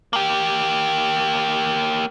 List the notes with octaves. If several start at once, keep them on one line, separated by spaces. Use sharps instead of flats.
A#3 G4